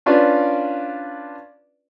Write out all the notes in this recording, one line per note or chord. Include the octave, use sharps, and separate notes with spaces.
C#4 D4 F4 B4 D5 F5